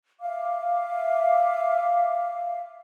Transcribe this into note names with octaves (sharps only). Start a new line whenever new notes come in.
E5 F5 D6